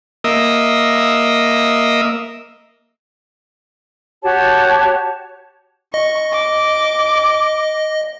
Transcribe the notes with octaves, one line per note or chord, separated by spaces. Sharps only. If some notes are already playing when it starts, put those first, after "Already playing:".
A#3 D#5 E5
F#4 G4 C#5 A5
D#5 C#6
D6